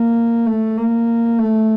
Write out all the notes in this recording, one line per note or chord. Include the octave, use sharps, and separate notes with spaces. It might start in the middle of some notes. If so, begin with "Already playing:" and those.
Already playing: A#3
A3
A#3
A3